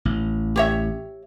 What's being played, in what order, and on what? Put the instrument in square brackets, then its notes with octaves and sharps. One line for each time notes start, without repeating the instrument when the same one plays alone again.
[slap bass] A1
[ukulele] G4 C#5 E5